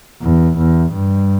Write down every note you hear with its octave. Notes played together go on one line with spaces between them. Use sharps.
E2
E2
G2